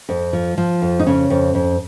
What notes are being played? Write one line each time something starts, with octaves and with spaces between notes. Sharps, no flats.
F2
F3
F3
F2
D#4
C#3 C#4
F2
F2